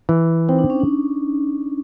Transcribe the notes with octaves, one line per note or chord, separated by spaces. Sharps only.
E3
C4 D#4
D4
C#4
D4